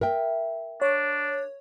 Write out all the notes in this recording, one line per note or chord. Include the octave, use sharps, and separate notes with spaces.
A#4 E5 G5
D4 C#5